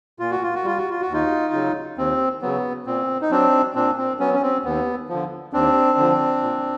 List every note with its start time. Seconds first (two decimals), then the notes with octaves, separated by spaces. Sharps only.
0.19 A#2 F4
0.31 F#4
0.43 F4
0.55 F#4
0.64 G3 F4
0.78 F#4
0.90 F4
1.01 F#4
1.08 D#2 D#4 F4
1.53 C#3 F#3
1.98 D#2 C4
2.42 C#3 F#3 B3
2.86 A#2 C4
3.21 D#4
3.31 F#3 C4 D4
3.75 A#2 C4 D4
3.97 C4
4.19 F#3 B3 C#4
4.34 C#4
4.42 C4
4.64 D#2 B3
5.09 D3 F3
5.53 D#2 C4 D4
5.98 D3 F3
6.42 A#2